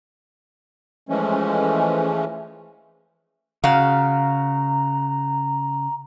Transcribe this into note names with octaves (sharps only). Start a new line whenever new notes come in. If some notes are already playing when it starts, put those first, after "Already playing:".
E3 F3 G#3 A3 C#4
C#3 F#4 F5 A#5